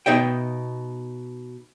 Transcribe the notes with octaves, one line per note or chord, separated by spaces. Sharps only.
B2 D#4 D#5 E5 G5